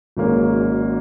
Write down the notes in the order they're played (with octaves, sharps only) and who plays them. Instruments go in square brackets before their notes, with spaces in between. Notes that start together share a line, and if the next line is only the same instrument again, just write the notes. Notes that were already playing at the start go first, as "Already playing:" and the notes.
[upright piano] G#1 G#2 F#3 A#3 C#4